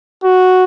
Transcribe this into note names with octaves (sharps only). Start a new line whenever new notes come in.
F#4